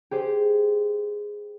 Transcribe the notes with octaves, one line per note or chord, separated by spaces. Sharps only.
G4 G#4 C5